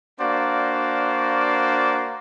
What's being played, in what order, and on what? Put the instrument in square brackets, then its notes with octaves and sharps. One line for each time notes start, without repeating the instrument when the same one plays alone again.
[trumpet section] A#3 D4 F#4 C5 D5 F5